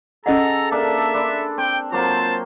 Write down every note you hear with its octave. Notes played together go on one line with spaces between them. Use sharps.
C#4 G#4 A4 D#5 F#5 A#5
A#3 D4 E5 A5
D4 B5 C6
C4 G5
F#3 A#3 C4 F4 C5 A5